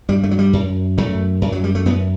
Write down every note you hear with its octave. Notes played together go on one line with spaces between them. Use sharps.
G2 G3
A3
F#3
G3
F#2
F#2 A3
F#2
F#3
G3
A3
F#2 B3